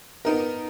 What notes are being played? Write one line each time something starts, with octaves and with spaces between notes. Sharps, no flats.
B3 D#4 A#4